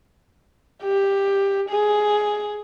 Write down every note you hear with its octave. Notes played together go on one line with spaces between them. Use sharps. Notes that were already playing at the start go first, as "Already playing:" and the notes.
G4
G#4